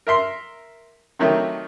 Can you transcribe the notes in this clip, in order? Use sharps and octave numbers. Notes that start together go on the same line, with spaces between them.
A#4 E5 C6
C3 D#3 F#3 A3